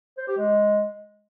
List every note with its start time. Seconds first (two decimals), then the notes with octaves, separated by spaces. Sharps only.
0.18 C5
0.27 G4
0.37 G#3